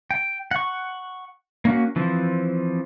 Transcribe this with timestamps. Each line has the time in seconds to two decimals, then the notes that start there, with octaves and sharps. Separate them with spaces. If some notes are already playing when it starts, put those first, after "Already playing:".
0.11 G5
0.51 F#5 C#6
1.65 A#3 C#4 F#4
1.96 E3 F3 C4